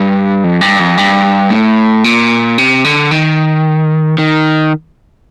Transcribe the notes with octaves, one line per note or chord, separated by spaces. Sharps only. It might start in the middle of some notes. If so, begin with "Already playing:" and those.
Already playing: G2
F2
G2
F2
G2
A2
A#2
C3
D3
D#3
D#3